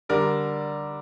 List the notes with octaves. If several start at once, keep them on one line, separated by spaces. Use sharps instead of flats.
D3 G3 A#4 D5